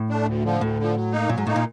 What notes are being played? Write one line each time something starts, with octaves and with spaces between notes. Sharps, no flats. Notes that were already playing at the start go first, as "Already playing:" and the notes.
Already playing: A2
A3 D4
D2
D3 F3
D2 A2
D3 F3
F#3
A#3 D#4
A#2 F#3
G#2
A2 A#3 D#4
A#2